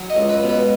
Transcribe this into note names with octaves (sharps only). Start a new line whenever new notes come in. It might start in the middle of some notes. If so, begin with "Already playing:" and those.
Already playing: F#3
D#5
C#2
B4
B2
B4